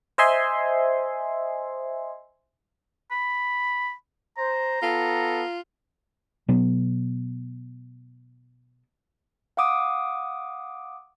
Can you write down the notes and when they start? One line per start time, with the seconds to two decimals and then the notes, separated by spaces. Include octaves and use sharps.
0.18 C5 D#5 E5 G#5 C6
3.11 B5
4.38 C5 A#5
4.82 B3 F4 A4
6.48 B2 F#3 B3
9.57 F5 F#5 D6 D#6 D7